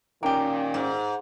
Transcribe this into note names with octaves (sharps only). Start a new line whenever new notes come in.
A#2 D#3 A#3 C#4 G4 G5
G#2